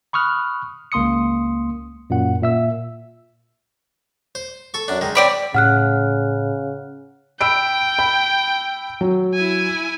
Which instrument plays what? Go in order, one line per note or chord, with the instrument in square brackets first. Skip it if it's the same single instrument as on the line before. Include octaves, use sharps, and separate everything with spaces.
[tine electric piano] B5 C#6 D#6 F6 F#6
C#2 A#3 C6 D#6 C#7
F#2 A#2 F#5
A#2 E5 E6
[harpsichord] C5
A4 C#6
F#2 D4
D#3 G#3
[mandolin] C4 D5 B5 [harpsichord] C#5
[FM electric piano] A2 [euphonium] C#3 [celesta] F#5 F6 F#6
[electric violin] G5 [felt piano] B5 E6 D7
[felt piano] B5
F#3
[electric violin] E4 G#5